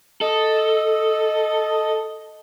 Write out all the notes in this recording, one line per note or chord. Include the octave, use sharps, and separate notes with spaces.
A4 D#5